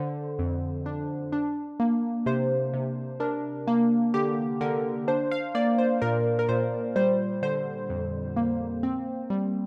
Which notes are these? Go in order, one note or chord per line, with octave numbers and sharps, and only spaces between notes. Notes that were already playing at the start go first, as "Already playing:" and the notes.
Already playing: D3 C5
F2
D4
D4
A#3
C3 C5
C3
D4 A#4
A#3
D3 G4
D3 A#4
D4 C5
F5
A#3 D5
C5
A#2 A#4
A#4
A#2 C5
G3 C5
D3 C5
F2
A#3
C4
G3